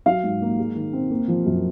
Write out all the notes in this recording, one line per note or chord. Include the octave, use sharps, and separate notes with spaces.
F#3 F5
G#2
A#3
G#3
D#3
C4
A#3
F3
F#2